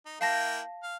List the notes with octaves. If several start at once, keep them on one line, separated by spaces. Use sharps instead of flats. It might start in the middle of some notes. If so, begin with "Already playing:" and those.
D#4
A#3 E4 F5 G5 A5 A#6
F5